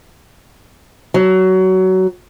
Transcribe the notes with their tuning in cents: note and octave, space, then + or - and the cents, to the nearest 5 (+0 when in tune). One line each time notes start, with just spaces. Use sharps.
F#3 +20